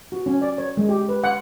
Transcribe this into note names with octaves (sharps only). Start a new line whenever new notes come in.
F#4
C#4
D5
C#5
G#3
G4
B4
F#5